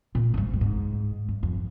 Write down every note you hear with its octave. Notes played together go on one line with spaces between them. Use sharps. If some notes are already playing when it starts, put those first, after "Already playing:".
A#2
G2
G#2
A#2
G#2
G2
F2